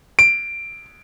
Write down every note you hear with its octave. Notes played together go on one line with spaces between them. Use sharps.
D7